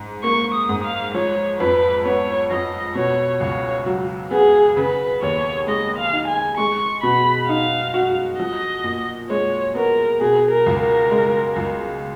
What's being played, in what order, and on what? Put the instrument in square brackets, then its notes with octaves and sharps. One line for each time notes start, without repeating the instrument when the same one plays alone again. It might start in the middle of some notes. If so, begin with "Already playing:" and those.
Already playing: [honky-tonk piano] G#2
[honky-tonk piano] A#3 [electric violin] C#6
[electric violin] D#6
[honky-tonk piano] G#2
[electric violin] F5
[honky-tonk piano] F3 [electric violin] C#5
[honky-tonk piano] F2 [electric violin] B4
[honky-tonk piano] B3 [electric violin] C#5
[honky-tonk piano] F2 [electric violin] D#5
[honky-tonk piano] B2 [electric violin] C#5
[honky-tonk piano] C#2 [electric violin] C#5
[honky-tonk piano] F#3
[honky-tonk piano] B3 [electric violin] G#4
[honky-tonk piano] C#3 [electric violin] B4
[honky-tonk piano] D#2 [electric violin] C#5
[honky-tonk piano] G#3 [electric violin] D#5
[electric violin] F5
[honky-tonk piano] D#4
[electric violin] G#5
[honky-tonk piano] G#3 [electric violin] C#6
[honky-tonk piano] B2 [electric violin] B5
[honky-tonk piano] D#4 [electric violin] F5
[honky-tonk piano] F#4
[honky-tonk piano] F3 [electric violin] D#5
[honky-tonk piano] A#2
[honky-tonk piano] G#3 [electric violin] C#5
[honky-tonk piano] B3 [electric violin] A#4
[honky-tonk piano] B2 [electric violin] G#4
[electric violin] A#4
[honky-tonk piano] C#2
[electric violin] A#4
[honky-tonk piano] G#3
C#2